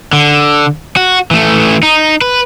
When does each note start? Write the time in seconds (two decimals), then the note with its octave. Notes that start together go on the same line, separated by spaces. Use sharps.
0.13 D3
0.96 F#4
1.31 E3 A3
1.83 D#4
2.21 B4